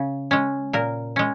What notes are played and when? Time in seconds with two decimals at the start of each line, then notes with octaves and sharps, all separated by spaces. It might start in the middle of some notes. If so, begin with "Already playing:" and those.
Already playing: C#3
0.31 G#3 C#4
0.73 A#2 A#4
1.16 G#3 C#4